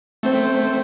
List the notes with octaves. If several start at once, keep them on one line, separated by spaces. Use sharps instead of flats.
A3 C4 C5